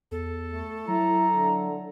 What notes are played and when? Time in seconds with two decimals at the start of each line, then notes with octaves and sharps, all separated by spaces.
0.11 E2 A4
0.53 A3
0.88 F#3 E4 A#5
1.36 D3